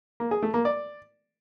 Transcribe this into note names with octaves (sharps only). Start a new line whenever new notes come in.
A#3
G#4
A3
A#3
D5